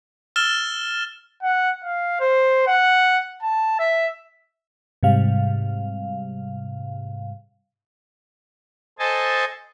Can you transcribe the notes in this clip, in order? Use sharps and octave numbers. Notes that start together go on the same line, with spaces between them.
E6 F6 A6 E7 G7
F#5
F5
C5
F#5
A5
E5
G#2 C3 G3 F5
A4 C5 D#5 G#5 A5